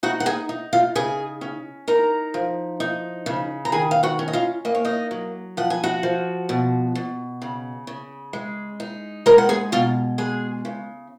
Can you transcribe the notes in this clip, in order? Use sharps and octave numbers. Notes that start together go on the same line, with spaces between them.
D#4 F#4 F#5
F#5
G#4 G#5
D#4
F4 F5
C#3 G#4 G#5
C#4
D#4 A#4 A#5
F3
D#4
C#3
A#5
D#3 G#4 G#5
F5
F#4 F#5
C#4
D#5
F4 F5
A#3 D#5
C#5
D#4 D#5
F#3
F3 F#5
G#5
F#4 F#5
F3
B2
B2
C#3
C#3
G#3
D#4
G#3 A#4 A#5
F#5
G#4 G#5
B2 F4 F5
G#3 G#4 G#5
C#3